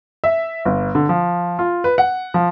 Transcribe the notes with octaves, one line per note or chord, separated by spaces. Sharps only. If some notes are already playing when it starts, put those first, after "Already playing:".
E5
G1
D3
F3
F4
B4
F#5
F3